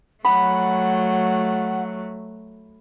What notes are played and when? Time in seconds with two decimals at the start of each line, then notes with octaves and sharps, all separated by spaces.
0.25 F#3 A3 F#5 B5